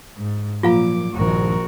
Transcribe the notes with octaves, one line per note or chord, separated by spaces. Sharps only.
G#2
A#2 F3 F#3 A#3 F4 F5 A#5 D6
A#1 G2 D#3 F#4 A#4